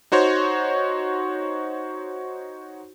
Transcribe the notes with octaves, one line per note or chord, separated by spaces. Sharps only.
D#4 F#4 C5 C#5